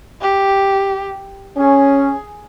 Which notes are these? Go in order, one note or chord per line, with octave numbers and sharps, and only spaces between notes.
G4
C#4 G#4